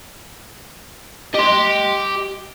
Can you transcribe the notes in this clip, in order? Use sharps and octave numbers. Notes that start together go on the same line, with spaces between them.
G4 D#5 C6